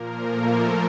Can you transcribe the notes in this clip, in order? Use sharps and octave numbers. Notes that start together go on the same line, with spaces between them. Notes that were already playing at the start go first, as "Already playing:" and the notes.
Already playing: A#2 F3 A#3 A#4
A3 A4